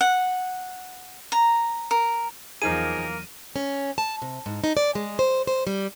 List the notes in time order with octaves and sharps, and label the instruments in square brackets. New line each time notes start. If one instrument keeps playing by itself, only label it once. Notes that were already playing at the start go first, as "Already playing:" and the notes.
[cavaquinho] F#5
A#5
A#4
[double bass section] E2 F#3 [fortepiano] F3 D#4 G#4 [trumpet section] A#3 A#4 [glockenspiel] D#7
[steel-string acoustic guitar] C#4
A5
C3
G#2
D#4
D5
G#3
C5
C5
G3